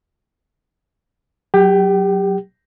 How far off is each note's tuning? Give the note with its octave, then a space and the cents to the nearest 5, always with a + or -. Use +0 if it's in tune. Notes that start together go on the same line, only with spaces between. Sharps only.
F#3 +5 G4 +25 G5 -35